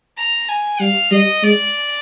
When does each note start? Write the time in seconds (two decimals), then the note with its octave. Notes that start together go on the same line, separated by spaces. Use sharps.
0.17 A#5
0.49 G#5
0.80 G3 F5
1.11 G3 D#5
1.43 G#3 D5